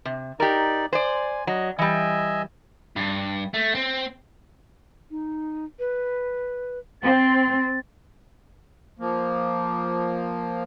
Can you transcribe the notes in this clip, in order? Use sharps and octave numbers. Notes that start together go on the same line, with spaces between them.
C3
D#4 G4 A#4 D5
C5 D5 G#5
F#3 D#5
E3 G3 D#5 E5 G#5
G2
A3
C4
D#4
B4
C4 A6
F3 A#3